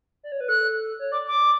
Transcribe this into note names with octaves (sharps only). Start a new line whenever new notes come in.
D5
C#5
B4
A4 F#6
C#5
D5 D6
D6